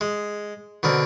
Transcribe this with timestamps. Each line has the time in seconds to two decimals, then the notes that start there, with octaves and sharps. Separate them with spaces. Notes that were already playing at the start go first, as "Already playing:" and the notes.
0.01 G#3
0.83 B2 D3 C4 A#4